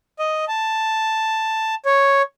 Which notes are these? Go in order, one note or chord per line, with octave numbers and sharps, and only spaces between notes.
D#5
A5
C#5